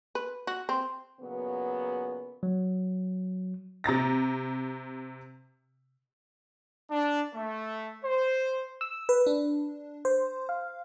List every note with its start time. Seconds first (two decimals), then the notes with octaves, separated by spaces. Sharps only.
0.15 B4
0.47 F#4
0.69 C4
1.20 A#2 C#3 F#3 B3
2.43 F#3
3.84 C3 A#5 A6 A#6
6.90 D4
7.34 A3
8.04 C5
8.81 E6
9.09 B4
9.26 D4
10.05 C5
10.49 F5